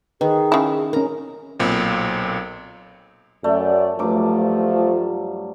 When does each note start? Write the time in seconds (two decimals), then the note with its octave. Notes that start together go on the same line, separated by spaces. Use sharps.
0.21 D#3 G#4 B4
0.52 C#3 E4
0.93 C#4 A#4 A#5
1.59 B1 A#2 C4
3.44 F#2 A3 D5
3.99 G2 F3 F#3 A3 D6